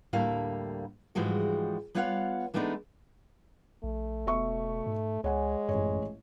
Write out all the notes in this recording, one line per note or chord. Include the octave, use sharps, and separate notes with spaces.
D2 A2 G3 A#3 E4 F5
G#2 E3 F3 G3 G#3 F#4
G3 B3 F4 C#5 F5 F#5
E3 G#3 A3 B3 D4 D#4
A#1 A3
E1 B2 E5 C#6
G#2
C#2 G#3 C#5 F#5 G#5
A1 F#2 C#5